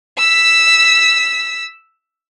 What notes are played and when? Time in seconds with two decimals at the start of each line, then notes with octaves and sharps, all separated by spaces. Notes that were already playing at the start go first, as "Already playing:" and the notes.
0.18 E6 B6